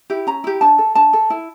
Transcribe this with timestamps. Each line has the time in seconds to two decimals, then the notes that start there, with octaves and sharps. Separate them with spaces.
0.10 E4 G4
0.27 C#4 A#5
0.44 E4 G4
0.61 D4 A5
0.78 A4
0.95 D4 A5
1.13 A4
1.30 E4